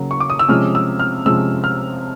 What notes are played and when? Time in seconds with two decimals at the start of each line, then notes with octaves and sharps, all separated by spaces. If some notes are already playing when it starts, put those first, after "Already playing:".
Already playing: C#3 F#3 A#3
0.11 C#6
0.20 D6
0.30 D#6
0.39 E6
0.48 C3 F3 G#3 C#4 F6
0.75 E6
0.99 F6
1.25 C3 F3 G#3 C#4 E6
1.64 F6